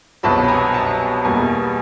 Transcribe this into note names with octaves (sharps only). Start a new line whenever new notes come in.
C2 B2 F#3 A5 B5
B5
G#5 A#5
A5 B5
E2 B2 G3 A#3 G#5 A#5